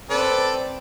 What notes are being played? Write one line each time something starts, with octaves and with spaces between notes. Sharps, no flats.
C4 A4 B4 D5